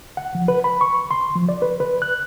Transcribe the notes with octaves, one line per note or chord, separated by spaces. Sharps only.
F#5
F3
B4
B5
C#6
C6
F3
D5
B4
B4
F#6